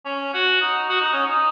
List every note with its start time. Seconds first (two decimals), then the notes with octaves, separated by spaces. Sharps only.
0.05 C#4
0.34 F#4
0.62 D#4
0.90 F#4
1.01 D#4
1.13 C#4
1.26 D#4